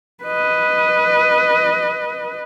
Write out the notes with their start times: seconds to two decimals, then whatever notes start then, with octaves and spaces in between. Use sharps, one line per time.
0.24 B4 D#5